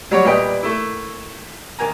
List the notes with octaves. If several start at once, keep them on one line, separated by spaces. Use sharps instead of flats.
F#3 G3 F#4 C#5
A#2 G3 B3 D#5 G5 B5
A3 A#3 E4
D#3 A#3 G#5 A#5